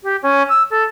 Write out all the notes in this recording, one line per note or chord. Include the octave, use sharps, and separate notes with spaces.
G4
C#4
E6
A4